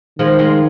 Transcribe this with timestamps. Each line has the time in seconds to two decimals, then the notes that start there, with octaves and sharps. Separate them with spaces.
0.19 D#3 F3 G#3
0.39 F3 G#3